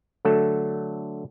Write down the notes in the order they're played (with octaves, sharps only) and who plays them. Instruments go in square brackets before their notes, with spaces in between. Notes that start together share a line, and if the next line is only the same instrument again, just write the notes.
[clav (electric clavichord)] D3 F#3 A3 A4